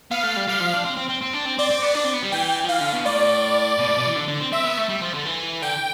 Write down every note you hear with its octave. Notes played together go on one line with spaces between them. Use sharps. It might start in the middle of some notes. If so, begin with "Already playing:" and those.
B3 F5
A3
G3
G3 F5
F3
D4
C4
C4
C4
C4
D4
C4
C4 D5
C4
B3
D4
C4
B3
G3
E3 G5
F3
E3 F5
D3
B2
A2 D5
B2
A2
B2
E3
D3
D3
C4
C4 E5
B3
A3
G3
F3
D3
E3
D3 G5